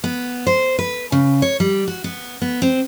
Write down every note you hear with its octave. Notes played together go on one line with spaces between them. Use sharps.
B3
C5
B4
C#3
C#5
G3
F#4
B3
B3
C4